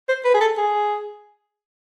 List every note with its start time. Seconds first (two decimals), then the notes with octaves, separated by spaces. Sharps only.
0.09 C5
0.25 B4
0.34 G#4
0.41 A4
0.58 G#4